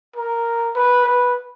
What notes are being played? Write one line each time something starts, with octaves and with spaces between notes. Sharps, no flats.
A#4
B4
B4